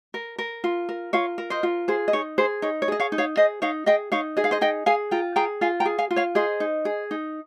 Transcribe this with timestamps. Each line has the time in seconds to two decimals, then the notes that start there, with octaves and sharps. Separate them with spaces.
0.14 A#4
0.38 A#4
0.64 F4
0.89 A#4
1.13 F4 C#5 F5
1.38 A#4
1.50 C5 D#5
1.63 F4
1.88 G#4 C5
2.08 D#5
2.13 D#4 C#5
2.38 G#4 C5
2.62 D#4 C#5
2.82 C#5
2.88 G#4 D#5
3.00 C#5 F5
3.12 D#4
3.18 C#5 F5
3.37 G#4 C5 D#5
3.62 D#4 C#5 F5
3.86 G#4 D#5 G5
4.12 D#4 C#5 F5
4.37 G#4 D#5
4.44 F5
4.51 C5 D#5
4.61 D#4 D#5 G5
4.86 G#4 F5 G#5
5.11 F4 G5 A#5
5.36 G#4 G5 A#5
5.61 F4 F5 G#5
5.80 G5 A#5
5.85 G#4
5.98 F5 G#5
6.11 F4
6.16 C#5 F5
6.35 G#4 C5 D#5
6.60 D#4
6.85 G#4
7.11 D#4